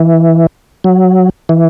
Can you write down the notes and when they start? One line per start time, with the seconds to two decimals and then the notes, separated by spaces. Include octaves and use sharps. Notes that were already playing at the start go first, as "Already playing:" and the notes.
Already playing: E3
0.84 F#3
1.49 E3